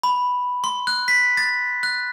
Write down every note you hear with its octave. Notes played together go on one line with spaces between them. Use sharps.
B5
C6
F#6
B6
A6
F#6